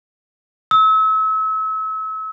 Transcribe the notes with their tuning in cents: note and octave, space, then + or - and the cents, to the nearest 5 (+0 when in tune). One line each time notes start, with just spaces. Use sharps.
E6 -35